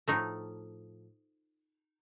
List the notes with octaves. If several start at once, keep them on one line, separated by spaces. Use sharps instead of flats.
A2 F3 A3 D#4